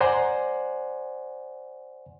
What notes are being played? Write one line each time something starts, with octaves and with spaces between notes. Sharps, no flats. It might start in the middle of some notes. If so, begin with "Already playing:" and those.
C5 D5 F#5 G#5 A#5 C6